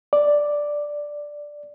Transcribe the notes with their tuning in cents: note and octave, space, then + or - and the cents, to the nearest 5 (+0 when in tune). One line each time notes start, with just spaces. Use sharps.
D5 +0